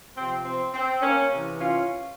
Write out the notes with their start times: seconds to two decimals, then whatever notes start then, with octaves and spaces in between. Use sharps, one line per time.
0.15 C3 F3 C4
0.45 C4
0.74 C4
1.02 A#3 C#4
1.31 C3 E3
1.59 C#4 F4